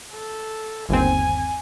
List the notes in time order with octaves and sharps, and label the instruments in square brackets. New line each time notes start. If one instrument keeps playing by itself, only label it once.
[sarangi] A4
[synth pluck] G1 D#2 C4 [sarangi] G#5